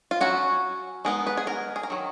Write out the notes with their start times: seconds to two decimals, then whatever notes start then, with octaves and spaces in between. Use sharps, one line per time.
0.11 F4
0.21 F#3 C#4 F#4
1.05 G#3 B3 D#4 A#4
1.27 B4
1.37 G#4
1.47 A#4
1.76 G#4
1.83 A#4
1.90 D#3 F#3